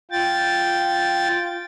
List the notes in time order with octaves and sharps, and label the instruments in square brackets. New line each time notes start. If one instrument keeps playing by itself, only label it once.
[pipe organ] F4 G5 A6